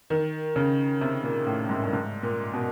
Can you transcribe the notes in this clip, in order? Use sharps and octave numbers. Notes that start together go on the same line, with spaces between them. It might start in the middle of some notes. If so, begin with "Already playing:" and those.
D#3
C#3
C3
A#2
A2
G#2
G2
G#2
A#2
B2